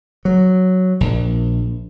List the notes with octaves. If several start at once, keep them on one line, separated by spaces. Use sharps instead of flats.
F#3
A#1